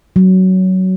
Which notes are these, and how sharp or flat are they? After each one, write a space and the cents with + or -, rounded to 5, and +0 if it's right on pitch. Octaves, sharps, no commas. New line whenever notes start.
F#3 +15